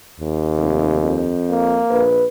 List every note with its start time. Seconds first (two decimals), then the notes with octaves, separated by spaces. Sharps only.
0.20 D#2
0.57 F1
1.03 F2
1.50 A#3
1.90 A#1 B4